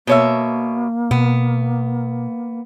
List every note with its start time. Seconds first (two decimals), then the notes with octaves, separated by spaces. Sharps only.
0.07 B2 A#3 C#5 E5
1.11 B2 B3